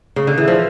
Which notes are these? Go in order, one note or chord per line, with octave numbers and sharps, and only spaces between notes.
C#3
D3
E3
F3